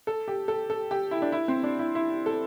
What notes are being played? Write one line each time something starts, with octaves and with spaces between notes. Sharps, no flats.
A4
G4
A4
A4
G4
E4
D4
E4
C4
D4
E4
E4
A4